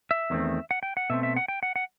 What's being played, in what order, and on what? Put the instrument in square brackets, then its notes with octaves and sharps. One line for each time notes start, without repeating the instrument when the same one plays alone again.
[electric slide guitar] E5
E2 D#3 F#3 A3 C4
F#5
G5
F#5
B2 A3 C4 E5
E5
F#5
G5
F#5
F#5